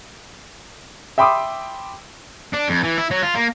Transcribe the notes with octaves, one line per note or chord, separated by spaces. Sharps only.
E5 G5 B5 C6 D6 D#6
D4
F2
E3
E4
F#3
F4
A#3